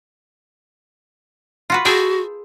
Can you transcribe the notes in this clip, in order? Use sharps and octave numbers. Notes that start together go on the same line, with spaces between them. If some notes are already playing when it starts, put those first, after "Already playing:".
F4 F#4 B4
F#4 G#4 A4 G5